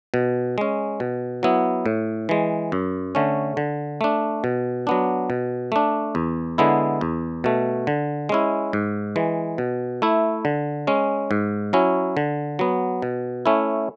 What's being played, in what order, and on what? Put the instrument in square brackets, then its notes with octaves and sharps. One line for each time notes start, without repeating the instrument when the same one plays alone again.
[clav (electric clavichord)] B2
G#3 C#4
B2
F#3 B3 E4
A2
E3 G#3
F#2
D3 A3 C#4
D3
A3 D4
B2
F#3 B3 D4
B2
A3 D4
E2
D3 G#3 B3 E4
E2
B2 A3
D3
G#3 C#4 E4
G#2
E3 G#3
B2
A3 E4
D3
G#3 C#4
G#2
F#3 C#4 E4
D3
F#3 B3
B2
A3 C#4 E4